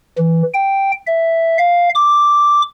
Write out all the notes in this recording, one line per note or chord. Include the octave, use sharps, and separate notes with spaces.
E3
G5
E5
F5
D6